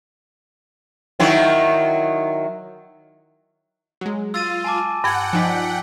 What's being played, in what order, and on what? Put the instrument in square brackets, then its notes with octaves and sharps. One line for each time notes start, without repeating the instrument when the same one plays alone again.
[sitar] D#3 F#3 E4
[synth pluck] F#3 G#3
[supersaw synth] F4 [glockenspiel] E6 A6 D#7
[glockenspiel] G#5 A5 D6
[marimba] G2 G#6 [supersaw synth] F#5 G5
[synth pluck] F3 D#4 D5 [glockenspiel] G#5 B6